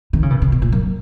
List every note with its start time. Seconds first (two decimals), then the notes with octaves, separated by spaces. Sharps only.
0.13 D#3
0.23 C#3
0.31 B2
0.42 C#3
0.52 B2
0.62 A#2
0.72 F#2